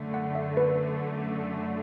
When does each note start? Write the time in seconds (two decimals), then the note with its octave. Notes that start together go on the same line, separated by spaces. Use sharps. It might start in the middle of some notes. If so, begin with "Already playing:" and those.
Already playing: F#2 D3 A3
0.14 F#5
0.35 E5
0.57 B4